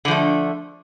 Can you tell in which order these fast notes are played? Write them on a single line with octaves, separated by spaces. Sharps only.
D3 F3 A3